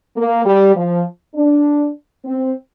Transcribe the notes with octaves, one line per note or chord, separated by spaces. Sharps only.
A#3
G3
F3
D4
C4